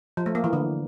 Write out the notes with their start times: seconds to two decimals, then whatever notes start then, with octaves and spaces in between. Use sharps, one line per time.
0.17 F3
0.26 A3
0.35 A#3
0.44 E3
0.53 D3